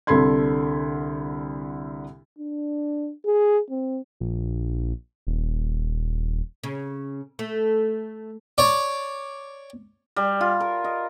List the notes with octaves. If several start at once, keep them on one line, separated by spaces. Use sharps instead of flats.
C2 D3 A4 B5 C6 G#6
D4
G#4
C4
A#1
D#1
C#3
A3
C#5 D5
G3
F4
A#4
D#5